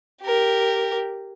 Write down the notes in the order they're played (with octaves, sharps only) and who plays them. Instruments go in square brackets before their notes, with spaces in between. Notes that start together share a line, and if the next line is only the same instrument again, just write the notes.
[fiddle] G4 A#4